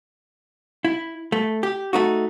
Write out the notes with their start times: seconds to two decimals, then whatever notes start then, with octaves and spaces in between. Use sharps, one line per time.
0.85 E4
1.32 A3
1.63 G4
1.93 A3 D#4 F#4